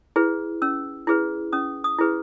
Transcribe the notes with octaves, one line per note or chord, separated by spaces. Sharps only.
E4 G#4 B4
C#4 E6
E4 G#4 B4
C#4 D#6
D#6
E4 G#4 B4